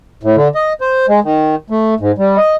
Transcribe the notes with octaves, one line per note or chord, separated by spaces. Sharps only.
A2
D3
D#5
C5
G#3
D#3
A3
G#2
G3
D#5